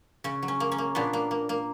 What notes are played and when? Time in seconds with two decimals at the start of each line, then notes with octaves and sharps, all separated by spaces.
0.24 C#3 C#4
0.42 F#3
0.48 C#4
0.60 A#3
0.72 C#4
0.78 A#3
0.95 A#2 B3 D4
1.13 A#3
1.31 A#3
1.49 A#3